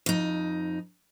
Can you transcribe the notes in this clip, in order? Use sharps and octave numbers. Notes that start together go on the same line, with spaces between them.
F2 D#4